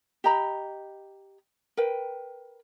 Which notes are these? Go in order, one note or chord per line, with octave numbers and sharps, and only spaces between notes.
G4 D#5 A#5 B5
A#4 B4 G5